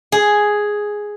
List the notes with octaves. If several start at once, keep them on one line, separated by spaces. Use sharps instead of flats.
G#4